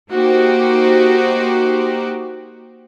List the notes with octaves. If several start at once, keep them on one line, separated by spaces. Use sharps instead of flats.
A#3 D#4 F#4 G4 C5